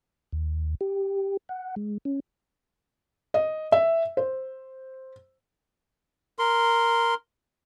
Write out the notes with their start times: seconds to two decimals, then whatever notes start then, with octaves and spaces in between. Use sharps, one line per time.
0.33 D#2
0.81 G4
1.49 F#5
1.76 G#3
2.05 C#4
3.34 D#5
3.72 E5
4.17 C5
6.39 A#4 C6